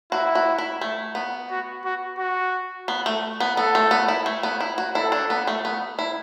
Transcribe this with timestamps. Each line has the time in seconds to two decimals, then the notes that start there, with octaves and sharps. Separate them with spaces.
0.12 E4 F#4
0.35 F#4
0.58 E4
0.81 A3
1.15 B3
1.50 F#4
1.85 F#4
2.19 F#4
2.88 B3
3.06 A3
3.40 B3
3.57 B3 A4
3.75 A3
3.91 B3
4.08 E4
4.26 A3
4.43 B3
4.60 E4
4.78 F#4
4.95 E4 A4
5.12 D4
5.30 B3
5.47 A3
5.65 B3
5.99 E4